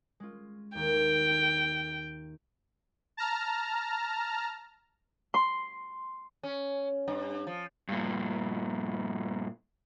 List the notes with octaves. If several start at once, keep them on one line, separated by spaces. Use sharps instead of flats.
G#3 C#4 F4
D#2 D#3 G5
A5 A#5 F6
C6
C#4
G2
F3
G2 A#2